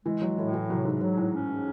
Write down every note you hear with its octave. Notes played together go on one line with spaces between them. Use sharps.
E3 G#3
F#3
A2 E3
E3
C3 F#3
G#2
G#2 F#3
A2
C#4